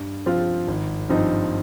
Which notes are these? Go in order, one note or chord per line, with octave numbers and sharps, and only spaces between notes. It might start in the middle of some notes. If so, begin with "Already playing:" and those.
Already playing: G2
F3 C4 F4
G#1
G2 F3 C4 D#4